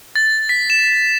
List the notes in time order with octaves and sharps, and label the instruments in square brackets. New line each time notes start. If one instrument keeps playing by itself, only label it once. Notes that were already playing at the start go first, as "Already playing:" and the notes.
[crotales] A6
B6
E7